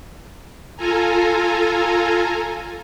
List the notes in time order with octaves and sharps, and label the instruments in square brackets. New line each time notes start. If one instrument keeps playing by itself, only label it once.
[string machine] F4 A4 G#5 A#5